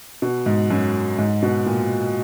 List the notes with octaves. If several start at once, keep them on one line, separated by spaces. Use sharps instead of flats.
B2
G#2
F#2
G#2
B2
A#2